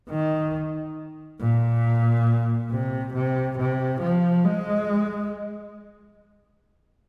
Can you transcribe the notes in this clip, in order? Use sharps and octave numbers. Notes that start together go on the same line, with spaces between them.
D#3
A#2
C3
C3
C3
F3
G#3